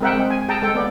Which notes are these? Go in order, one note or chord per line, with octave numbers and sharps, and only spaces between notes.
G#3 C4 A#4 E5 F#5 G5
G#3 C4
G#5
G#4 G5 A5 A#5
G#3 A4 G5
A#3 B3 D5